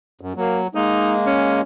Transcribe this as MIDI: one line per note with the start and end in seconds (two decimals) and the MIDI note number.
0.21 0.33 42
0.36 0.67 54
0.36 0.61 58
0.75 1.61 56
0.75 1.61 58
0.75 1.13 63
1.26 1.62 61